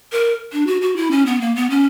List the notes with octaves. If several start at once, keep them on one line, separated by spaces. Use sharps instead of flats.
A#4
D4
F#4
F#4
E4
C#4
B3
A#3
B3
C#4